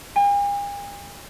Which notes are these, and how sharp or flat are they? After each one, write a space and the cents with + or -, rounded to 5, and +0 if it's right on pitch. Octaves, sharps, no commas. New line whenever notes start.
G#5 -45